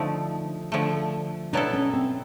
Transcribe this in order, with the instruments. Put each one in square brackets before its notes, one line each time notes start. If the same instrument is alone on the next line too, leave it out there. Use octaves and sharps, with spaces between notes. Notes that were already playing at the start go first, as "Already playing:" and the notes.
Already playing: [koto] D3 F3 A3 [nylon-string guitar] D#4
[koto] D3 F3 A3
[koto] B2 F#3 B3 E4 A4 [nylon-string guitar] D4
[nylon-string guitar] C#4
C4